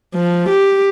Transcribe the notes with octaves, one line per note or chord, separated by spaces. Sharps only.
F3
G4